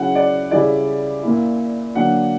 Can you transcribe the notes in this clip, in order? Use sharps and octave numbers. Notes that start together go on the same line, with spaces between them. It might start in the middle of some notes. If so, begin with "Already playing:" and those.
Already playing: C#3 F#3 C#4 E4 F#5
D5
C#3 G3 C#4 E4 D5
A#2 A#3 E4
D3 F#3 A#3 D4 F#5